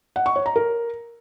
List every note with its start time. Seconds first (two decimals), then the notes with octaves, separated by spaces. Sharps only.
0.16 F#5
0.26 C#6
0.36 C#5
0.46 A#5
0.56 A#4